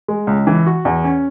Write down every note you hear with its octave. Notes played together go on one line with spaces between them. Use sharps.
G#3
C#2
E3
F#4
E2
C#4